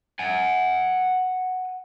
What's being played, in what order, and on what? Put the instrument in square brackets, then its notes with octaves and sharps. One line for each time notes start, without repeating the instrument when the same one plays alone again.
[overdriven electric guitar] F#5 G#5